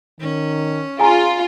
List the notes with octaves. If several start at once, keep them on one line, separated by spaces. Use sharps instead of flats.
D#3 C#4
F4 G#4 G#5 A#5